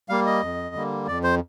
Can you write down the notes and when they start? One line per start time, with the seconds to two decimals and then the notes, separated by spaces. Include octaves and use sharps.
0.09 G3 A#3 F5
0.26 D#5
0.42 F2
0.75 D3 G3 A#3
1.07 F2 D5
1.24 C5